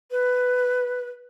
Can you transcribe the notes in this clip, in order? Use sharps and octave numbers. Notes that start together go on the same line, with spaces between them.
B4